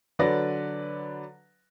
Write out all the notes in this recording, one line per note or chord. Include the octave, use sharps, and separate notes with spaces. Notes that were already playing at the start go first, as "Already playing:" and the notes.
D3 F#3 B4 D5 A#6